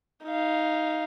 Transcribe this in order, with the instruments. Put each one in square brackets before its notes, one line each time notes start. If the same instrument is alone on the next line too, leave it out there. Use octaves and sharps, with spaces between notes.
[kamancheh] D#4 F5